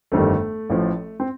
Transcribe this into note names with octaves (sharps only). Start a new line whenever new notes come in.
G1 F2 D#3 G3 A3
A1 A2 F3
C4